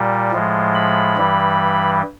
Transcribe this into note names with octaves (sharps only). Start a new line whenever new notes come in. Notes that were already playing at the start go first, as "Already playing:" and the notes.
Already playing: A#2 G3
A2 F3 G#3
B5
G2 E3 G3